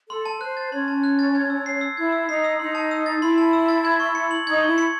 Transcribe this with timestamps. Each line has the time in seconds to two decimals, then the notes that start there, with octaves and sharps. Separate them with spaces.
0.10 A4 C6
0.26 A5
0.41 C5 F#6
0.57 A6
0.72 C#4 C#5 C6
0.88 A5
1.04 F#6
1.19 A6
1.35 G#6
1.50 E6
1.66 C7
1.81 E6
1.97 E4 G#6
2.12 E6
2.28 D#4 C7
2.44 E6
2.59 D#4 C6
2.75 A5
2.91 E6
3.06 A6
3.22 E4 C6
3.38 A5
3.53 E6
3.69 A6
3.85 G#6
4.00 C#6
4.15 C#7
4.31 F#7
4.47 D#4 G#6
4.63 E4 C#6
4.78 C#7